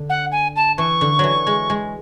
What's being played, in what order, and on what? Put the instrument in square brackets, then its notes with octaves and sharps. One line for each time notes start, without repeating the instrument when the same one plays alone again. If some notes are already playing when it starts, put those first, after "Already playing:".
Already playing: [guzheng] D3
[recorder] F#5
G#5
A5
[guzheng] E3 [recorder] C#6
[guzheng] D3
E3 F#3
G#3
G#3